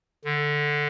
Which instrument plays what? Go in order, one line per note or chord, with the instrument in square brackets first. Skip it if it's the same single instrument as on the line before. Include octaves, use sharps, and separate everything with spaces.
[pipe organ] D3